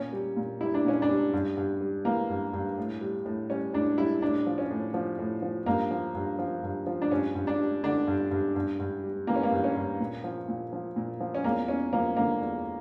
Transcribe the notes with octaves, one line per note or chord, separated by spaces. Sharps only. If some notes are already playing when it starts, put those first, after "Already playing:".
Already playing: A#2 C#4
G3
A#2
G3 E4
D4
A#2 C#4
D4
G3
G2
G2
G3
E3 A#3
G2
G2
A2
G3
A2
G3 C#4
A2 D4
G3 E4
A2 D4
F3
C#4
A2
F3
A2
F3
G2 A#3
F3
G2
F3
G2
F3
D4
G2 C#4
G2
D4
G3
D3 D4
G2
G2
G2
G2
G3
E3 A#3
C#4
A#3
G2
C#4
G2
A#2
F3
A#2
F3
A#2
F3
C#4
E2 A#3
E2 C#4
F3 A#3
D3 A#3
E2